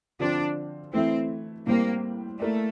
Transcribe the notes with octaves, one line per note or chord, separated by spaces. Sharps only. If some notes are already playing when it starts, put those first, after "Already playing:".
D3 F3 C4 D4 F4
E3 A3 C4 E4
A2 G3 A#3 C4
A3 A#3 E4 A#4 D5